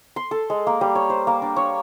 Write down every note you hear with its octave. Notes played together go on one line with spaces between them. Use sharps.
C6
A4
G#3
A#3
G3
C#5
C5
A#3
D4
C#5